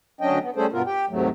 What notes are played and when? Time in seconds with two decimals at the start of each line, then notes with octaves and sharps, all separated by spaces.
0.21 D2 F#3 C#4 D4 D#5 G5
0.41 B3
0.56 G3 A3 C#4 G#4 A4 C5
0.73 G2 B2 B3 F4 A#4
0.86 G4 G5
1.09 D#2 G#2 C3 F#3 A3